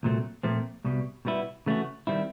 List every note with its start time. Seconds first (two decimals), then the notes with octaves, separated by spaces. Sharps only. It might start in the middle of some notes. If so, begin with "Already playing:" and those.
0.03 C2 A#2 F#3 A3 C4
0.43 A#2 F3 A3 C4
0.85 C2 B2 G3
1.25 B2 G3 B3 E4
1.66 C#3 E3 A3 C#4 F#4
2.07 D#3 G3 C4 E4